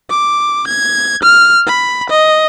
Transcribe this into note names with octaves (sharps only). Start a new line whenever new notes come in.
D6
G#6
F6
B5
D#5